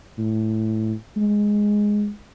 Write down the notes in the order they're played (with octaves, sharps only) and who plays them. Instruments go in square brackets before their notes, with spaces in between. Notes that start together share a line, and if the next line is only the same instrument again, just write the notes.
[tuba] A2
G#3